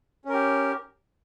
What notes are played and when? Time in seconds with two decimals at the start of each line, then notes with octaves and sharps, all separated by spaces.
0.25 C#4
0.29 A#4
0.33 G4